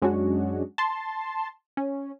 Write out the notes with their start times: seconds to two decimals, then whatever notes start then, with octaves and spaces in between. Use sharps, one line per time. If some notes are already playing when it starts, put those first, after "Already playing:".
0.02 F#2 G#3 C#4 D4 F#4
0.78 A5 C6
1.77 C#4